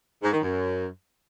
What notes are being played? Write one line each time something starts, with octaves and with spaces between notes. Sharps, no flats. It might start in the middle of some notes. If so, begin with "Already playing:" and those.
G#2
D#3
F#2